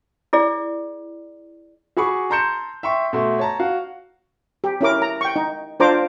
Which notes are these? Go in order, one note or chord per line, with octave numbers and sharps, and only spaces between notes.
E4 G#4 D5
F#4 G#4 B5 C#6 D6
A5 A#5 C6 G6 C#7 E7
E5 G5 C6 C#6
B2 A3 E5 C6
C#5 A5 A#5
F#4 F5
G4
C#4 E4 A#4 D6
A#5
G5 C#6
D#4
D4 F4 C5 A#5 D6